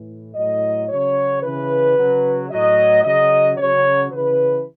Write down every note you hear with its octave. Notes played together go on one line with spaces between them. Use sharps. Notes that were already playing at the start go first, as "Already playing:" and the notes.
Already playing: A2 E3
A2 F#3 D#5
C#3 F#3 C#5
C#3 E3 B4
C#3 F#3
A2 F#3 D#5
C#3 F#3 D#5
C#3 F#3 C#5
C#3 E3 B4